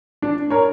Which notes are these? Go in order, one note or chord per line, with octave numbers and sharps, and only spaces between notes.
D4
A#4 C#5